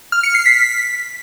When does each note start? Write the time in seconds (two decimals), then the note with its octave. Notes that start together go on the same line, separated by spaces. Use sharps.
0.12 F6
0.23 C#7
0.35 C7
0.46 B6